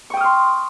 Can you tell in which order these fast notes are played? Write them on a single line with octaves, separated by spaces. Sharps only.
C#6 G5 D#6 F6 C6